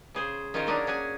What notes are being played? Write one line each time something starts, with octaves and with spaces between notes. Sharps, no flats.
C#3 G#4 C5
D#3 C#4 D#4 F4 A#4 C5
F#3 A#3 C#4 D4 G#4
C#4 F#4 G#4 G#5